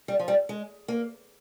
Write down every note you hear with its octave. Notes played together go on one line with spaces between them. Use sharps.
G3
F3
G3
G#3
A#3